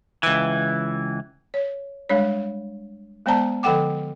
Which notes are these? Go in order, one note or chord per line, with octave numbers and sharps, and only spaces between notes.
C#2 E3
C#5
G3 G#3 D4 C#5
G#3 B3 C5 D5 A5 A#5
D3 F3 A4 F#5 G5 D6